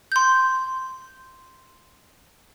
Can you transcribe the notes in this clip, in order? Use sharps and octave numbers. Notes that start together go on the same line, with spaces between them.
C6 G6